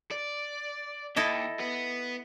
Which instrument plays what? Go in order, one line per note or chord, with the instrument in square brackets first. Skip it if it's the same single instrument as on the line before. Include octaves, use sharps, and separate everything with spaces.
[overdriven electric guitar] D5
[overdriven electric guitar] D#2 [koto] E4 A4 D#5
[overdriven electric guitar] B3